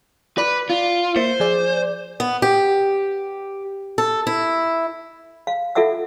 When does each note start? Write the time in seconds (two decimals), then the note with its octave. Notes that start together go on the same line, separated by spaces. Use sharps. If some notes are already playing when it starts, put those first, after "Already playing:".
0.38 B4 D5
0.70 F4
1.16 A#3 C5 E5
1.40 F3 G#4 D5
2.20 B3
2.42 G4
3.98 A4
4.27 E4
5.47 F5
5.75 F4 A4 E5 F#5 E6